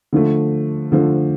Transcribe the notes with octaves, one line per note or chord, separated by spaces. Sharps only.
D3 F3 A3
D3 F3 A3